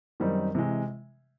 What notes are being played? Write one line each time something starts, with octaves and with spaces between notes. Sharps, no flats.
F#2 D#3 G3 C4 D#4
C3 E3 G#3